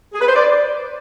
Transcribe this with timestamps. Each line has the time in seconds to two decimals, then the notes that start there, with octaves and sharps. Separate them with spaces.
0.13 G#4
0.20 B4
0.27 C5
0.35 D5